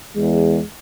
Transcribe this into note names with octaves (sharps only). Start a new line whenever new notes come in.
E2 G#3